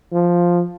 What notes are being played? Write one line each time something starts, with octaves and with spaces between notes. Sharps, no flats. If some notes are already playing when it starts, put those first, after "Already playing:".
F3